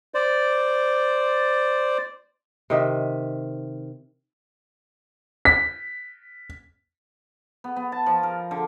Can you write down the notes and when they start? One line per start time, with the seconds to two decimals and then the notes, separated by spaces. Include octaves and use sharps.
0.14 C5 D5
2.70 C3 D#3 E5
5.45 B6
7.64 B3
7.76 B3
7.92 A5
8.06 F3
8.23 A#4
8.51 D3